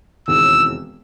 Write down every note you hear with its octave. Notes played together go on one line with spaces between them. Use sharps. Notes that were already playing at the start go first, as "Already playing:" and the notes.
E1 D#2 C#3 E3 C4 E6